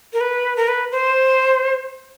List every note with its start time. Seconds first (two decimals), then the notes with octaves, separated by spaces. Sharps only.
0.13 A#4
0.21 B4
0.57 A#4
0.68 B4
0.92 C5